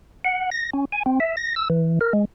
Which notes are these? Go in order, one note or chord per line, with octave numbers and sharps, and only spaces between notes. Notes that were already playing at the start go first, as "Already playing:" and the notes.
F#5
A#6
C#4
G#5
C4
E5
A#6
E6
E3
A#4
G#3